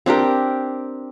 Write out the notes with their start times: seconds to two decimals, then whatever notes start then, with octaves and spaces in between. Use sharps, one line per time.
0.06 C4 D4 G4 A#4